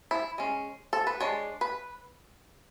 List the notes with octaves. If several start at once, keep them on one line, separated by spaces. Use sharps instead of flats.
E4
G#3 C#4
A4
B4
G#3 D4 C#5
B4